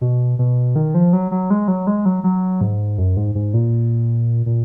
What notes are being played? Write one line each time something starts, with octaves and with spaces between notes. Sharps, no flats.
B2
B2
D#3
F3
F#3
F#3
G#3
F#3
G#3
F#3
F#3
G#2
F#2
G#2
G#2
A#2
A#2